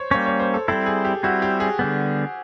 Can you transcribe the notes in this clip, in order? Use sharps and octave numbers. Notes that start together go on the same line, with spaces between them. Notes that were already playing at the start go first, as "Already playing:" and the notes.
Already playing: C5 C#5
G3 A#3 C#4 C#5
C#5
C5
A4
G3 C4 E4 A4
G#4
G4
G3 C4 E4 F#4
G4
G#4
D3 G3 B3